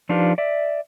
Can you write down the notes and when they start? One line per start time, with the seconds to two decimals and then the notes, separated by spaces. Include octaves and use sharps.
0.09 F3 D4 D#4 F4 G4 B4
0.38 D5 E5